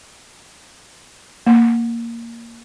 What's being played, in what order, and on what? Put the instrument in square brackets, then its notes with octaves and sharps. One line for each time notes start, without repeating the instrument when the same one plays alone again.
[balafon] A#3